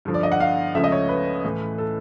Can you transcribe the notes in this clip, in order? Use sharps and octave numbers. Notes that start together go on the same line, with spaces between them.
G2 D3 F3
D5
D#5
F#5
F5
C#2 C#3 F3 A3 E5
D#5
C#5
B4
A2 E3 A3
A4